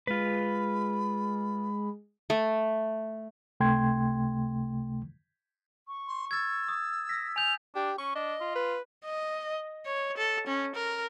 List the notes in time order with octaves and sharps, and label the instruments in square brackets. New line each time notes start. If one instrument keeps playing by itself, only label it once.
[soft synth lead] G#3 [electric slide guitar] F4 B4 [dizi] B5
[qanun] A3
[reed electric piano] C#2 C3 A3 G5 C6 G#6
[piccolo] C#6
[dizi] C6
[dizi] E6 [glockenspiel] G#6 A6
[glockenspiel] D#6
[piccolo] A#6 [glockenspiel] B6
[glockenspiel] G#5 G6 [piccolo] F7
[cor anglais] D4 [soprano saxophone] G4
[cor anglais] C#4 [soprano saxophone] C#6
[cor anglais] D4 [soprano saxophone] D#5
[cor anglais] F4
[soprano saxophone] B4
[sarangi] D#5
C#5
A4
C#4
A#4